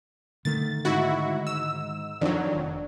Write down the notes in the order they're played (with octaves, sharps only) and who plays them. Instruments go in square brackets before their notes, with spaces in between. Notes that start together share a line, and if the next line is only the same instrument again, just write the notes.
[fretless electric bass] D3 D#3 A3 [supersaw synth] A6
[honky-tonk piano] G#2 [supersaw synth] E4 F#4
[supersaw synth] E6
[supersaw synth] F2 F#3 [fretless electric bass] D#3 [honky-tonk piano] D4
[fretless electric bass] F1